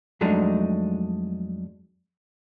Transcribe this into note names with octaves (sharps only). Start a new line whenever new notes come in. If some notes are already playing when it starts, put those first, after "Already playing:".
F2 F#3 G#3 A3 D4 D#4